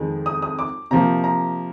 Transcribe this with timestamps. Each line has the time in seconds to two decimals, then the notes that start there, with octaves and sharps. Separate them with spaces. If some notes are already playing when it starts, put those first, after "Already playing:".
Already playing: F2 D#3 G#3
0.26 D#6
0.42 D#6
0.59 D6
0.91 C3 F3 A#3 A#5
1.24 A#5